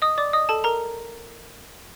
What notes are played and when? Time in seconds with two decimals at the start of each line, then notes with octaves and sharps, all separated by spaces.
0.02 D#5 D#6
0.18 D5 D6
0.33 D#5 D#6
0.49 A4 A5
0.64 A#4 A#5